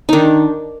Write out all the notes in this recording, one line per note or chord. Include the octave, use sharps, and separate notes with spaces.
D#3 D4 D#4